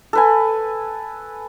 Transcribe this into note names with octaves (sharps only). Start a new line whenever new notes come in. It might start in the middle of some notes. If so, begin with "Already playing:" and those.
A4 B4 G#5